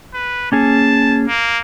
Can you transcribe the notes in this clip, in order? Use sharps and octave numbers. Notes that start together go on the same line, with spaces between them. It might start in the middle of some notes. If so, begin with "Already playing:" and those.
B4
A#3 C#4 G#4 A5
A#3